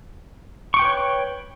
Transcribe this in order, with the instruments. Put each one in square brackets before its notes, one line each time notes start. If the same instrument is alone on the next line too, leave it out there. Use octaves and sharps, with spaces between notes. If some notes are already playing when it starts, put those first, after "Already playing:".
[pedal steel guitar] C#6
D6
G5
B4
C#5